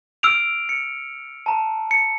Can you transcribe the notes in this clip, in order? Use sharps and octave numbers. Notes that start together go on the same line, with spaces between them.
E6 F6 C7 D7 F7
C#7
A5 A#5
C#7